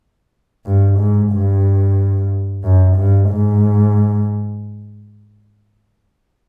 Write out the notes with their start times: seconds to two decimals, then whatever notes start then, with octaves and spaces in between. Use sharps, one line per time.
0.66 G2
0.99 G#2
1.32 G2
2.64 F#2
2.97 G2
3.29 G#2